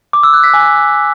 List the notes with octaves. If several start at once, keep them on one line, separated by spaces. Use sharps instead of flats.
D6
E6
F#6
B6
G#5